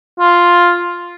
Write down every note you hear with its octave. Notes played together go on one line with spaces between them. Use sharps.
F4